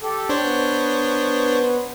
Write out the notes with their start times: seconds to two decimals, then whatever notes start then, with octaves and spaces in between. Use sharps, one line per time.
0.02 G4 A4
0.29 D4 C5 C#5
0.42 B3